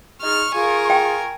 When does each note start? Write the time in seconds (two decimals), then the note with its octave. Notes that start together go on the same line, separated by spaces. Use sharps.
0.22 D#4 F4 G#4 C#6 F6
0.54 F4 G#4 A#4 G#5
0.90 G5